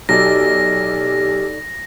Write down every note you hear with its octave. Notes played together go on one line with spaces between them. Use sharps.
B1 D#4 G4 A4 D5 A#6